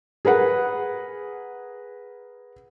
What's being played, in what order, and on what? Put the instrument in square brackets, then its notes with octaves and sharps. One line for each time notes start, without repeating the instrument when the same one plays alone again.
[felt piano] G#4 A#4 B4 F#5